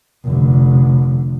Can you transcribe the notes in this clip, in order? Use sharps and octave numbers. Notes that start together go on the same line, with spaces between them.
F1 D3